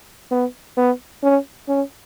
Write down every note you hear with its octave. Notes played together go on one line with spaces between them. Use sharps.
B3
B3
C#4
C#4